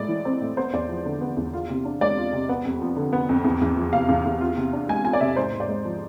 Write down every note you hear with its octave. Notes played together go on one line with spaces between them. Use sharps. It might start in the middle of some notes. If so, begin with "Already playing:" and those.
Already playing: A2 G#3 D5
E3
C4
A2
B3 C5
E2 D5
F3
D3
B3
E2
F4
C3
D4
G#3 D5
F4
C3
B3
F2
F3
D3
B3
F2
E2
E2
F3
C3 F5
E2
E2
F4
C3
D4
G#3 G#5
F4 G#5
D5
C3 E5
G#2 C5
G#2
D5
G#3
F3